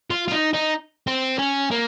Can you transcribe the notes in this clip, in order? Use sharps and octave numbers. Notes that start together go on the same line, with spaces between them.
F4
F4
D#4
D#4
C4
C#4
A#3